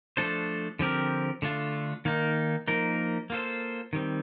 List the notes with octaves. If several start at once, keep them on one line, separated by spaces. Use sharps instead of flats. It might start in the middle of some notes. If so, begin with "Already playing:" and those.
F3 A3 D4 A4 C5
D3 F3 C4 G4 A#4
D3 A3 D4 F4
D#3 A#3 D#4
F3 A#3 D#4 A#4
A#3 F4 A4 C5
D#3 G3 C4